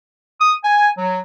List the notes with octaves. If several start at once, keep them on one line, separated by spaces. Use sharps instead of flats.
D#6
G#5
F#3